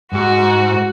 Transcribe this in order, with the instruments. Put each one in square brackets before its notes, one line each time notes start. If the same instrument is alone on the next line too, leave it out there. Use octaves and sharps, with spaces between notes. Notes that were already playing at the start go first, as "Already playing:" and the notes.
[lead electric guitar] G#2 [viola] F#4